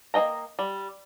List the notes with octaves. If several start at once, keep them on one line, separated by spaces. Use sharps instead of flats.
A#3 A4 D#5 G5 A#5
G3